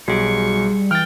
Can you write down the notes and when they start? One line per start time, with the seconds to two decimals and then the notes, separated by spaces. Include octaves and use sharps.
0.08 B1 G3 F#4 G#4 C#6
0.91 E3 G5 F6 A6